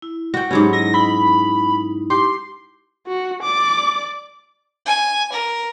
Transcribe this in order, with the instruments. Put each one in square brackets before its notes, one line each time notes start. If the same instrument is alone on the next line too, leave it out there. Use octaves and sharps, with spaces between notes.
[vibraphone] E4
[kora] F#4 G5
[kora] G#2 F#3 C#4 [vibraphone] G4 B5
[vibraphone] E4 D#5 [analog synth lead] A#6
[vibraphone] D#4 E4 [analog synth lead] B5
[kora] G4 [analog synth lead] C6
[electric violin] F#4
D5 D6
[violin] G#5
A#4